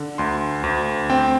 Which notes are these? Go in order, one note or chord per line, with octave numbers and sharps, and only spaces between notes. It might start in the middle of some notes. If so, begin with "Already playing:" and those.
Already playing: D3
D2 C6
D2
C4 G5